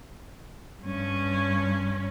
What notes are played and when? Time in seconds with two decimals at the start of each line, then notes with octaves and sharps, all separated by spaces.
0.82 G2 C#4